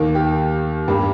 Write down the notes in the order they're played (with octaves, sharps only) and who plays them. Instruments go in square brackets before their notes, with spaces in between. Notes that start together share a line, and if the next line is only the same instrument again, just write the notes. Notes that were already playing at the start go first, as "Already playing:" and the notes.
Already playing: [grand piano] D#2 D#3 A#3
G4
G2 G3 A#3